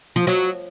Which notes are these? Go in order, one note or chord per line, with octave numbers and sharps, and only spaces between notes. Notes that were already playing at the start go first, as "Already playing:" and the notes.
F3
F#3